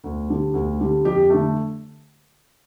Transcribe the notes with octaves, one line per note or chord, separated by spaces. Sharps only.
D2
D3 G3
D2
D3 G3
F2 G4
D3 A3